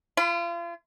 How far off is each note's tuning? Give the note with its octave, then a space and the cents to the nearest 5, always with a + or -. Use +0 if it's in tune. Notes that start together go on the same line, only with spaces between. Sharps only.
F4 -35 B5 +45